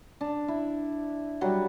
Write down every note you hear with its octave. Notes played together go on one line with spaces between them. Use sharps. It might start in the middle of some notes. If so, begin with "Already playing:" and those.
D4
E4
F#3 G3 F#5